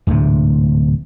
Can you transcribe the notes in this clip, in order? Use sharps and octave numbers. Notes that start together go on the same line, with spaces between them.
D1 D2 G#2 C3